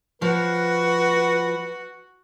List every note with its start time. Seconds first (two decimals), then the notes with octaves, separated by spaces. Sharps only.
0.22 F3 F#4 B4